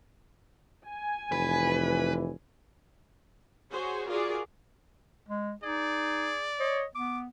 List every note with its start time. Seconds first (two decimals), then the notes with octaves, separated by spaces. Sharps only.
0.87 G#5
1.32 F1 E3 B4
3.72 F#4 G#4 C5 C#5
4.09 F4 F#4 G#4 A#4 D5
5.28 G#3
5.63 D#4 G#4 D5
6.60 C#5 D#5
6.95 B3 D6